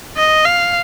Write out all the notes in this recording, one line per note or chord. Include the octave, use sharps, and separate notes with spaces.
D#5
F5